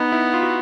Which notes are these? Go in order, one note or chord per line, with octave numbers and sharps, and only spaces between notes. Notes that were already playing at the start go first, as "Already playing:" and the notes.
Already playing: B3 D#4
E4
F4
F#4